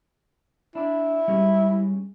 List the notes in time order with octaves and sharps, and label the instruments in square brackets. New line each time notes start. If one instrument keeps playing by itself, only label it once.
[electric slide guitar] D4 D5 [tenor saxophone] E4
[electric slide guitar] G3 G#3 C#4